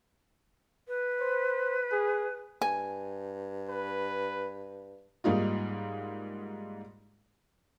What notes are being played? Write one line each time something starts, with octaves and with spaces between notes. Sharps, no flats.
B4
C5
G#4
G2 G#5
B4
G#2 G3 A#3 D#4 F4